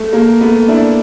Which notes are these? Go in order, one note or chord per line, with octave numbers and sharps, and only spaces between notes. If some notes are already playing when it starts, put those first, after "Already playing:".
Already playing: A3
A#3
A3 B3
D4 E4